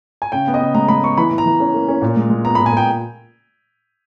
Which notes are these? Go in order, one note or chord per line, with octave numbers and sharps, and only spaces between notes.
G#5
C#3 G5
B3
D#5
C#3
G#3 A#5
G#3 B5
B3 C#6
E3 B5
E3
A#5
E3
C#4
A#3
C#4
A#2
G#3
G#3
B3 A#5
A#2 B5
G#5
A#2 G5